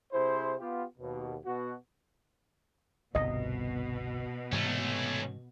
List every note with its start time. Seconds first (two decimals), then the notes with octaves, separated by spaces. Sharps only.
0.12 C3 E4 G#4 C5
0.59 B3 F4 G4
0.98 D#2 B2
1.44 B2 F#4
3.15 G1 C2 G2 B2 D#5
4.52 G#2 C3 E3 A3 C#4